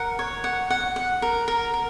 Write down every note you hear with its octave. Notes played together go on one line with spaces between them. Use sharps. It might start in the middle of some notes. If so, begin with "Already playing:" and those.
Already playing: A#4 F#5
C#5
F#5
F#5
F#5
A#4
A#4
A#4